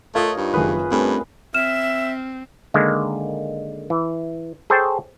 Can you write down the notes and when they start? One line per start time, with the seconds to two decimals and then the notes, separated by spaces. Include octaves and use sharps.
0.15 A3 F4 A#4 C#5 D#5 F5 G#6
0.37 G2 D#4
0.54 F#1 D#3 G#4 A#4 B4 D#6
0.91 G2 A3 C4 C#4
1.54 C4 E5 F6 E7
2.74 D3 D#3 G#3 A#3
3.90 E3
4.70 G#4 A4 C5 C#5 G5 A5